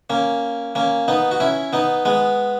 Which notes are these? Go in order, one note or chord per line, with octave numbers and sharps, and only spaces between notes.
A#3 C#4
A#3 C#4
B3 D#4
F#4
C#4 E4
B3 D#4
G#3 B3